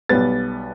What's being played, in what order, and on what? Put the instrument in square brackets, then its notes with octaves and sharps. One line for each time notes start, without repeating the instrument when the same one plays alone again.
[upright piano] B1 B2 G3 B3 A6